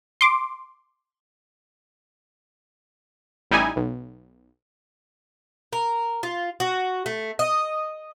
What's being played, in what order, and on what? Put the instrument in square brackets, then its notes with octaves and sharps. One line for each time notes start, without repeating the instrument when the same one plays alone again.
[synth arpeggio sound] C6 D6
[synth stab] A1 G3 D#4 E4 G#5
B1
[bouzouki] A#4
F4
F#4
A3
D#5